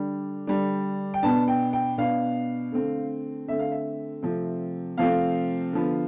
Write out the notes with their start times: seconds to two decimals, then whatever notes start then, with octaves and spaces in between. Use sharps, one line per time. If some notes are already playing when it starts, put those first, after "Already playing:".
Already playing: D3 G3 D4
0.47 D3 G3 D4
1.14 G5
1.23 B2 B3 D4 A5
1.48 G5
1.73 G5
1.98 B2 B3 D4 F5
2.72 D3 A3 C4
3.48 D3 A3 C4 E5
3.59 F5
3.71 E5
4.23 C3 F3 A3 C4
4.98 C3 F3 A3 C4 F5
5.73 D3 F3 B3